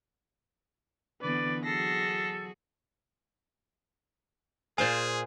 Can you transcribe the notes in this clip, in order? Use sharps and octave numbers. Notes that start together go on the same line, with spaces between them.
D3 E3 B3 B4 D5
F#3 F#4 G#4 A4 A#6 C7
A#2 G#4 C5 F5 G#5